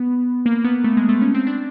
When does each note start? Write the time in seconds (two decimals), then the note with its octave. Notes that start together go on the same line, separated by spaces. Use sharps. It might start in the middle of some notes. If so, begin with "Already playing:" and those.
Already playing: B3
0.46 A#3
0.64 B3
0.84 A3
0.97 G#3
1.09 A3
1.22 C#4
1.35 C4
1.47 D4